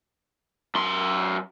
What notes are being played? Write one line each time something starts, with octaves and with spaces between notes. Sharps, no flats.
F#2 C6